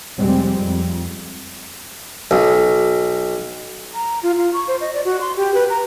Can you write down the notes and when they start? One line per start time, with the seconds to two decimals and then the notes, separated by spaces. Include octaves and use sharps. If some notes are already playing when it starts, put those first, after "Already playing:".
0.18 F1 G3 G#3 C4
0.62 F2
2.31 B1
3.94 A#5
4.23 F4
4.37 F4
4.53 C#6
4.68 C5
4.81 D#5
4.93 D5
5.05 F#4
5.21 C6
5.36 G4
5.54 B4
5.70 A#5